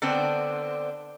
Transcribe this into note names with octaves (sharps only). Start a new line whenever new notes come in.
D3 B3 C4 D4